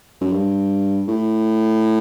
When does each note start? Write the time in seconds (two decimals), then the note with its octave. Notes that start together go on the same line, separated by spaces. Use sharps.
0.21 F#2
0.32 G2
1.08 A2